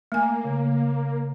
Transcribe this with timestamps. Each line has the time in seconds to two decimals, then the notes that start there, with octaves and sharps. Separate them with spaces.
0.12 A3 A#3 G#5
0.45 C#3